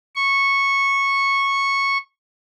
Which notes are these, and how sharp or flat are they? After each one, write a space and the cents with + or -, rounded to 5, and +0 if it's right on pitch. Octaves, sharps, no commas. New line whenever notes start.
C#6 -10